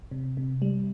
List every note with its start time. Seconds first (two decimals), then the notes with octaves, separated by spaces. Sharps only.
0.11 C3
0.37 C3
0.62 G3